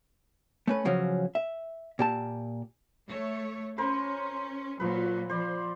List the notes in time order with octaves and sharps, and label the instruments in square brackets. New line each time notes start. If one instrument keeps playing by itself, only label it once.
[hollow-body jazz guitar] A3 C#4 B4
C#3 F3 F#3 C#4
E5
A#2 G4 A5
[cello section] A3 C#5
[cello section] C#4 [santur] A#4 C5 C6
[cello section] A#2 F#3 [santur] F3 B4
[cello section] F3 [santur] C5 D5